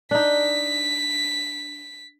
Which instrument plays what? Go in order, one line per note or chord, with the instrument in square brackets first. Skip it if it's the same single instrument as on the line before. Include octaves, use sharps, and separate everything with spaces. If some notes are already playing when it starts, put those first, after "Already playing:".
[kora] D4 D#4 [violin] B6